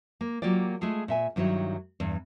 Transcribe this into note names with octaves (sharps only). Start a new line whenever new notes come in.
A#3
F#3 A#3 F4 G4 D5
G#3 A3 F4 G#4 A4
A#2 E5 G#5
G2 D#3 F#3 E4 C#5
E2 G2